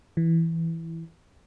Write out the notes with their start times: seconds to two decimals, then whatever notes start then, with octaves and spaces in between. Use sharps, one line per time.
0.17 E3